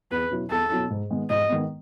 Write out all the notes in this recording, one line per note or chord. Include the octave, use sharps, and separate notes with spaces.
E2 B4
B2 F#3 C#4 E4
E2 A4
B2 F#3 C#4 E4
G#2
D#3 G#3 B3
G#2 D#5
D#3 G#3 B3